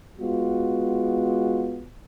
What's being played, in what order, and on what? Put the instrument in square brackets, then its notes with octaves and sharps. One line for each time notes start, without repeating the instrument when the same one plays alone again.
[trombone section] G#3 B3 F4 F#4